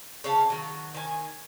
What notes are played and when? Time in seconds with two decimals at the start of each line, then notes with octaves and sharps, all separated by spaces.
0.24 C#3 C#5 F5 A5
0.50 D#3 F#3
0.94 D#3 G#5